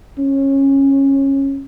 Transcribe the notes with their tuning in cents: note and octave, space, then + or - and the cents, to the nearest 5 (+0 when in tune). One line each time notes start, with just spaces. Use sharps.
C#4 -20